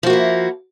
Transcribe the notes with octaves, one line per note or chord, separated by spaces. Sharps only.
F3 A#3 E4 F#4